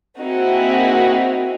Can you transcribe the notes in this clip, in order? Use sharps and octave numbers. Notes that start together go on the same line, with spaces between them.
A#3 C4 D#4 E4 F#4 G#4